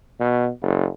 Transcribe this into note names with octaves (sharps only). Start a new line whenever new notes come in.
B2
F#1